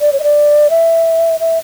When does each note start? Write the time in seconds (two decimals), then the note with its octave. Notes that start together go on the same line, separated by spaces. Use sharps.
0.01 D5
0.13 C#5
0.20 D#5
0.23 D5
0.70 E5
1.40 E5